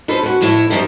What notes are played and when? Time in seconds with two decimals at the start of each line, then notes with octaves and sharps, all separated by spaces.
0.08 C#4 F4 A4 B4 C5
0.23 C#4 F#4
0.41 F2 A2 A3 E4 C#5
0.70 F#2 C#3 F3 G3 F4 E5